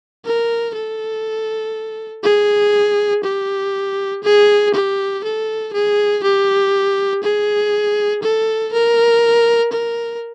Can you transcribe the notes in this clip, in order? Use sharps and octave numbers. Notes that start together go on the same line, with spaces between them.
A#4
A4
G#4
G4
G#4
G4
A4
G#4
G4
G#4
A4
A#4
A#4